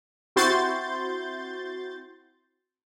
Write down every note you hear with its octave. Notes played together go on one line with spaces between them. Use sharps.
C4 E4 F#4 C6 G6 A6